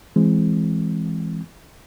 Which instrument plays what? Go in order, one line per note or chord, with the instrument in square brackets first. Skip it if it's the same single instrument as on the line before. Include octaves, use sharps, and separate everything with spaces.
[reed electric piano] E3 G#3 C4